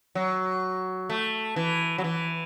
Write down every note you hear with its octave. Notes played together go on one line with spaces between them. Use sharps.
F#3
A3
E3
F#3
E3